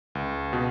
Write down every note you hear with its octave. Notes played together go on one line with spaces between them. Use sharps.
C#2
B2